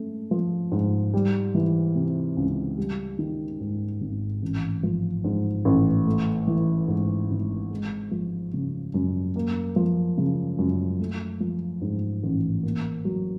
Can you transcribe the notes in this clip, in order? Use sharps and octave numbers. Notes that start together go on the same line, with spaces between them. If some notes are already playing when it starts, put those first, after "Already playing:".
Already playing: A3 C#4
F3
G#2
G3
E3
C3
C#2
G3
D#3
G#2
G#1
A1
F3
G#2
A1
A3
E3
G#2
G#1
G#3
F3
C#3
F#2
A#3
F3
C#3
F#2
A3
F3
G#2
A1
A#3
F#3